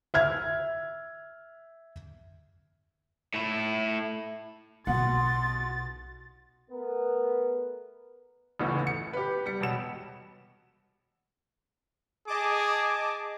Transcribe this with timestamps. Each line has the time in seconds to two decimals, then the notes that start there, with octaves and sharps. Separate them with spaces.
0.14 E5 F6 G#6
3.34 A2 E4
4.87 B1 B2 E3 F#5 C6 A6
6.71 A3 B3 A#4 B4
8.60 A1 D2 A2 C#3 E3
8.87 C#7
9.13 G4 B4
9.46 G3 C#7
9.60 E1 B2 E7
12.27 G#4 D#5 A5 D6